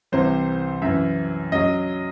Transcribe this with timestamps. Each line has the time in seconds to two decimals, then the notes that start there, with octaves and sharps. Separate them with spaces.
0.12 C2 C3 E3 C5
0.82 F#2 E3 E5
1.52 F#2 F#3 D#5